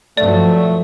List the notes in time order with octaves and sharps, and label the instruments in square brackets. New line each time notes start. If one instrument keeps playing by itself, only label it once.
[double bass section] G2 F3 F#3 [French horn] A3 [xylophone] D5